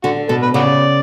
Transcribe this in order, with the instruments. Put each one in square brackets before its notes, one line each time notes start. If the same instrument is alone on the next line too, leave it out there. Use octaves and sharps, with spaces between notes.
[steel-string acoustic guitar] D3 [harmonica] F#4
[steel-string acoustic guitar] B2 [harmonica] A4
[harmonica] B4
[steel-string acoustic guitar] C#3 [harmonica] F#4 B4 D5